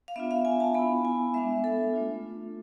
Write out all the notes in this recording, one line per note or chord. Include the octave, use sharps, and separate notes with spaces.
F5
B3 D4 F4 E5
F5
G#5
A5
B3 E4 B5
G#5
G#3 B3 D4 E5
A4
A3 D4 F4